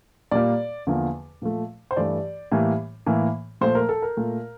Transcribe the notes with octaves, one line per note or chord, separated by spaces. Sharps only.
A#2 G3 A#3 D5
E2 D3 F3 A#3
A#2 F3 A3
C5
G2 E3 A3 D5
A2 E3 G3 A#3
A2 E3 A#3
A#2 F3 A3 C5
A#4
A4
A#4
A#2 A3